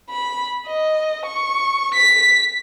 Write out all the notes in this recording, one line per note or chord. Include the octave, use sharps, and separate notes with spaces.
B5
D#5
C#6
B6